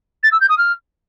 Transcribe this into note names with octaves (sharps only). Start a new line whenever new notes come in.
A6
E6
G6
D#6
F6